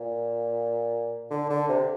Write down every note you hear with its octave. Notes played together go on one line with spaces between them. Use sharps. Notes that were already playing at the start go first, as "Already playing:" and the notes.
Already playing: A#2
D3
D3
C3